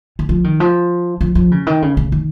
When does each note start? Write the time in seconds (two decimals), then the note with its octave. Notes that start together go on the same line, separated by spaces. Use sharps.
0.19 D#3
0.29 F3
0.44 D#3
0.60 F3
1.21 F3
1.35 F3
1.51 C#3
1.67 D#3
1.82 C#3
1.97 C#3
2.12 D#3